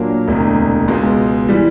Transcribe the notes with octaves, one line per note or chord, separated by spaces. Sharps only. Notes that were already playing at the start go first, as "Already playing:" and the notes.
Already playing: A#2 F#3 A#3 D4
E1 D2 C3
C#2 B2 G#3
E3 G3